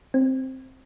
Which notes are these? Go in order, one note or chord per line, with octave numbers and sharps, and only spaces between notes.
C4